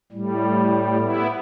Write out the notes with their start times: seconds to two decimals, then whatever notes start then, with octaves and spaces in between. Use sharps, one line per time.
0.12 A2 G3
1.00 B3 E4